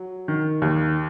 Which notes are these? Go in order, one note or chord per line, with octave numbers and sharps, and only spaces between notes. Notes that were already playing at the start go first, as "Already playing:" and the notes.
Already playing: F#3
D#3
D#2